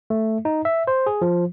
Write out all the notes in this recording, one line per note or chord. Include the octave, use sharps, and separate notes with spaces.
A3
D#4
E5
C5
G#4
F3